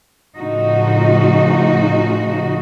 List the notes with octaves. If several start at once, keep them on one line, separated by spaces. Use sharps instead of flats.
A2 C#3 F3 D#4 F#4